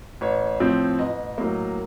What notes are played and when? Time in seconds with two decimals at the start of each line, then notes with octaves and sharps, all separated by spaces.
0.21 A1 C#5
0.60 A2 F3 C4
0.99 A1 D#5
1.38 A2 F#3 A#3